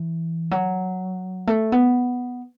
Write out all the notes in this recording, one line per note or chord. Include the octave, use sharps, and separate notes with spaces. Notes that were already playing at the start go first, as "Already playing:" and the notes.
Already playing: E3
F#3
A3
B3